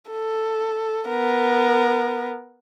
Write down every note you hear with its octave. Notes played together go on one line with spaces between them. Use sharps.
A4
B3 A#4